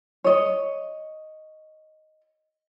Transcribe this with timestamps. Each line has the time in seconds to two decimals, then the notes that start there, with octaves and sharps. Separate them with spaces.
0.24 C#5 D#5